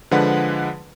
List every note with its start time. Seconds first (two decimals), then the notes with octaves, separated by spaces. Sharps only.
0.11 D3 F3 G#3 B4 F#5